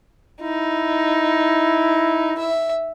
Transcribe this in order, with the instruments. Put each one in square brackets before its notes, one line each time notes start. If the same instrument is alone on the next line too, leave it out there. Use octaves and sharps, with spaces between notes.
[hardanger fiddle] D#4 [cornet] E4
[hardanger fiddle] E5